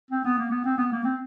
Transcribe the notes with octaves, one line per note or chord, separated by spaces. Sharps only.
C4
B3
A#3
B3
C4
B3
A#3
C4